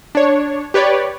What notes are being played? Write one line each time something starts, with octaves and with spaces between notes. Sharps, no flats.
D4 C#5
G4 B4 C#5 D5